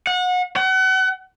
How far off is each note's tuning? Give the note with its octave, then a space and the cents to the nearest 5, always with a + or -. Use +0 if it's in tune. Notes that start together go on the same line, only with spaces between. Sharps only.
F#5 -30
F#5 +35